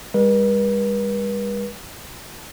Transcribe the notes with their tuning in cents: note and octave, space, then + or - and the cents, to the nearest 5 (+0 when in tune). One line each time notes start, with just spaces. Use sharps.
G3 +45 B4 -45